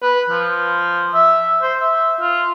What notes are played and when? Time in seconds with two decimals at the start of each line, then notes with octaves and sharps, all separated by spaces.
0.02 B4
0.30 F3
1.14 E5
1.62 C5
1.80 E5
2.20 F4